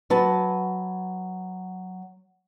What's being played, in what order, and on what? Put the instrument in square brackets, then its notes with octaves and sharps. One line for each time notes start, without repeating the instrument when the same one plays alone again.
[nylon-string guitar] F#3 B4 A5